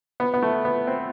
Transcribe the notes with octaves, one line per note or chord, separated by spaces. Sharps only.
B3
B3
A3
B3
C4